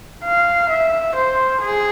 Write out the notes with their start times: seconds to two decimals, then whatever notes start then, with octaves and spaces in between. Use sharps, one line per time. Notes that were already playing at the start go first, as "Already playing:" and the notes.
0.24 F5
0.69 E5
1.15 C5
1.61 G#4